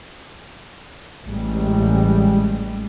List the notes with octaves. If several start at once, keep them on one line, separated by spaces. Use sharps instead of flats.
A1 G3 G#3